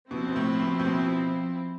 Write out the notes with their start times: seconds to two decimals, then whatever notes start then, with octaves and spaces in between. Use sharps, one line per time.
0.11 B2 F3 C4 E4
0.27 B2
0.36 A2
0.60 B2
0.79 A2
0.85 B2